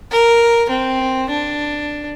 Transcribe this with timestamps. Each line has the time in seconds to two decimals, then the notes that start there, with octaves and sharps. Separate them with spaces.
0.11 A#4
0.69 C4
1.29 D4